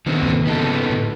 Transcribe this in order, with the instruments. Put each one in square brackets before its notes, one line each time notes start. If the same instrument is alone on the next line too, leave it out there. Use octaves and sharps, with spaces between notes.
[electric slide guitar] D3 B3 C4 [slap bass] D#3
[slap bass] D#2 A2 C3
[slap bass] G#2 C#3 [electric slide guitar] B3 D#4 A4
[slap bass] A2 D3